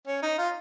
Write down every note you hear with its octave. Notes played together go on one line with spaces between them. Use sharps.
C#4
D#4
F4